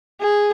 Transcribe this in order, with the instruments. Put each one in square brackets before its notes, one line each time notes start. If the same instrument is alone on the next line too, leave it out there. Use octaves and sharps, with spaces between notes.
[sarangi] G#4